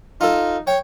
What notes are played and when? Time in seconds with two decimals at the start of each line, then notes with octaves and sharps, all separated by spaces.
0.21 D#4 F4 A4
0.67 C#5 G5